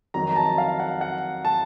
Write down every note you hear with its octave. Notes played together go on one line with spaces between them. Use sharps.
F2 D#3 F#3 A#5
A#5
A5
F5
F#5
F#5
A5